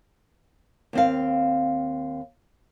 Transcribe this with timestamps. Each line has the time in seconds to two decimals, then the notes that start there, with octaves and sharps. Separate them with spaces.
0.93 D#2 C4 F5